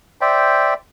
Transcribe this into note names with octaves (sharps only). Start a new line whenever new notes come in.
C5 D5 E5 G5